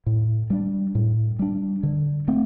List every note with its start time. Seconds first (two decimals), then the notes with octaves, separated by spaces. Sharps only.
0.06 A2
0.50 G3 D4
0.95 A2
1.39 G3 D4
1.83 D3
2.28 A3 C4